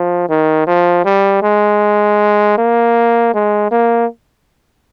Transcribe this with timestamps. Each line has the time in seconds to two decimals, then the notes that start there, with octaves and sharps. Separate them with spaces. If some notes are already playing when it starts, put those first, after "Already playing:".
Already playing: F3
0.29 D#3
0.67 F3
1.05 G3
1.43 G#3
2.57 A#3
3.34 G#3
3.71 A#3